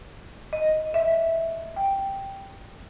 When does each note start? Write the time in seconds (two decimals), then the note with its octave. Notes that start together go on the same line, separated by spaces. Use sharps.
0.53 D#5
0.94 E5
1.76 G5